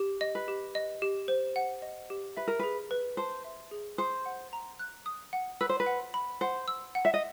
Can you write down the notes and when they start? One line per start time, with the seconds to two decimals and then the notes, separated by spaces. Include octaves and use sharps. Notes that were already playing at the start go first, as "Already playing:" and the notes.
Already playing: G4
0.21 D#5
0.35 B4
0.48 G4
0.75 D#5
1.02 G4
1.28 C5
1.56 F#5
1.82 D#5
2.10 G4
2.37 B4 E5
2.47 A#4
2.59 G#4 B4
2.91 B4
3.17 C5 A5
3.44 E5
3.71 G#4
3.98 C5 D#6
4.26 F#5
4.53 A#5
4.79 F#6
5.06 D#6
5.33 F#5
5.61 B4 E6
5.69 C5
5.80 B4
5.86 F#5
6.14 B5
6.41 C5 F#5
6.68 E6
6.95 F#5
7.05 E5
7.14 D#5